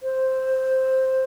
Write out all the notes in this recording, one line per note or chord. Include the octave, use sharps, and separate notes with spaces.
C5